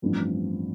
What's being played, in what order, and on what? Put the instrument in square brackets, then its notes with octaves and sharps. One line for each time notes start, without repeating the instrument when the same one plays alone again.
[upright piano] A1 G2 F3 C4